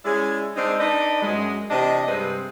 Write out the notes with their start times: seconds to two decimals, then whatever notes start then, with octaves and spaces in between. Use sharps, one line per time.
0.05 G#3 C#4 E4 G#4 D5
0.56 G#3 C4 D4 D#4
0.80 D4 D#4 B4 D5 D#5
1.22 F#2 G#3
1.70 C3 E3 D4 D#5
2.08 G2 C3 G#3 C4 B4